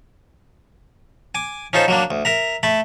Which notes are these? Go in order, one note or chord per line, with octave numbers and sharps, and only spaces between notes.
G#5 D6
C#4 D#4 F4 A4 C5
F#3 A#3 D4
D2
A#4 E5 A#5
A3 A5 B5